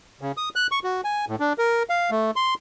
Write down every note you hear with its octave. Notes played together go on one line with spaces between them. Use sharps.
C#3
D#6
F#6
C#6
F#4
G#5
A2
D4
A#4
F5
A3
C6